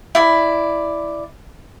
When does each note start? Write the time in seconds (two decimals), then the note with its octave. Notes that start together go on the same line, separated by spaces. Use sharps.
0.15 E4 D5 B5